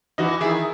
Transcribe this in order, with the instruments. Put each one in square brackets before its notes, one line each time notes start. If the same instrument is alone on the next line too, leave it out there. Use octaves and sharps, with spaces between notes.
[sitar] E3 [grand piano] D#4 F#4
[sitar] D#3 [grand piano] E4 G#4